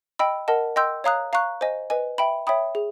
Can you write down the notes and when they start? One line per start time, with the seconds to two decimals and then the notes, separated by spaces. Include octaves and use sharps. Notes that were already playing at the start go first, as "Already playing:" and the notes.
0.19 D#5 G5 B5 E6
0.48 A#4 D#5 F#5 A5
0.76 D#5 G5 C6 E6 G6
1.04 C#5 F5 A#5 D#6 F#6
1.33 F5 A#5 C#6 F#6
1.61 C5 D#5 G#5
1.90 B4 D#5 G#5
2.18 E5 G5 B5
2.47 C#5 E5 G5 B5 D#6
2.75 G#4